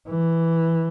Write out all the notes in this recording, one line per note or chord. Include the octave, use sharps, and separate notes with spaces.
E3